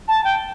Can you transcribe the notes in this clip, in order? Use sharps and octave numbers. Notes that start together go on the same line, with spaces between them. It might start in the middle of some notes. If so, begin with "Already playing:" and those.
A5
G5